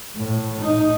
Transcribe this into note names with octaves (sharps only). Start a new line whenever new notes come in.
A2
D#4